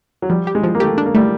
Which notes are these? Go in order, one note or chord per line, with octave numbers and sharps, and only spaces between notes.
F#3
F3 G3
G4
G#3
F3
A#3
A3 G4
D4
A#3
G3 A3